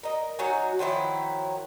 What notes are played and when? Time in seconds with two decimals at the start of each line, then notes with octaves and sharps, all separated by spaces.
0.03 A#4 D#5
0.39 F#3 D#4 F#4 G#5
0.79 D#3 F3 F#3 E4